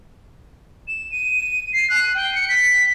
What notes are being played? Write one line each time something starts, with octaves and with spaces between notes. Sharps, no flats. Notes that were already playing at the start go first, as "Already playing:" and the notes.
E7
D#7
C7
F#6
G5
C#7
B6